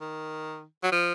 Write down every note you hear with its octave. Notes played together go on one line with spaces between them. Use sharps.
D#3
F#3
F3